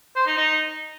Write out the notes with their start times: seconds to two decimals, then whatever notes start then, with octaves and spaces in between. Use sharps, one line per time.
0.16 C5
0.27 D#4
0.37 D#4